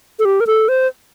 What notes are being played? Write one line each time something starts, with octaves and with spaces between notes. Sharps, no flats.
A4
G4
A#4
A4
C5